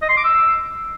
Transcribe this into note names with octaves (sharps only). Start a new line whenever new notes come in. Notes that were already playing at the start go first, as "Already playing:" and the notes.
D#5
C6
D6
E6